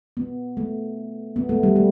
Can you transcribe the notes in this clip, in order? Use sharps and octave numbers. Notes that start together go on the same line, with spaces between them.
B3
A3
B3
A3
G3
A3